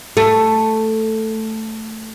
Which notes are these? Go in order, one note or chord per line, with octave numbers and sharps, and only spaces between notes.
A3